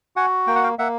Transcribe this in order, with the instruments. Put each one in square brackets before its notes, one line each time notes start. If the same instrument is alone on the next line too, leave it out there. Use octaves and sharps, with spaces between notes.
[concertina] F#4 F#5 G#5
A#3 G5
F#5
F5 G5
A#3 E5 F#5